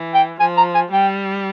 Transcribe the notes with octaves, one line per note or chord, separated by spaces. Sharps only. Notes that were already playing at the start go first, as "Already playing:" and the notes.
Already playing: E3
G5
F3 G#5
A#5
G#5
G3 G5